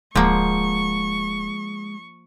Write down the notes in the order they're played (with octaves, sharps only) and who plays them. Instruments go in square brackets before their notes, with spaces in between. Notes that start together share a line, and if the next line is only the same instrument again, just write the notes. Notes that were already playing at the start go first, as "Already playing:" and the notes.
[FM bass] D1 [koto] F3 A#3 [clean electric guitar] G#3 G#4 F#5 [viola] C#6